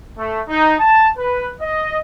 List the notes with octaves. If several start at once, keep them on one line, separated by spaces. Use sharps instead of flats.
A3
D#4
A5
B4
D#5